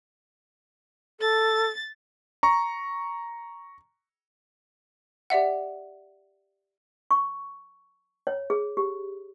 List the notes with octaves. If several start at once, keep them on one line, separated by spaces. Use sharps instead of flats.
A4 A6
A#5 C#6
G4 D5 E5 F#5
C#6
C#5
G#4
G4